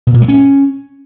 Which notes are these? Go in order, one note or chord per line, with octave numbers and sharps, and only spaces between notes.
B2
A#2
G#3
C#4